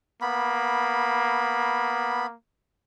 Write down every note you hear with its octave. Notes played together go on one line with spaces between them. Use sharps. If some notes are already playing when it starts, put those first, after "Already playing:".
A#3 B3 B5